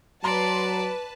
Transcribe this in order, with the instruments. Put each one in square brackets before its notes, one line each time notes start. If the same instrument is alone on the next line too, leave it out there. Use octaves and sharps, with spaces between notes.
[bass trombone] F#3 [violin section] B4 A5 [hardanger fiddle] D5 [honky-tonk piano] A#5 C6